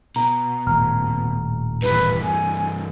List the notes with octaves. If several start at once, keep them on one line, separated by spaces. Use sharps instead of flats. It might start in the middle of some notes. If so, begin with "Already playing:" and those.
B2 A#5
D#1 A2 A#5 F6
G2 E3 B4
G#5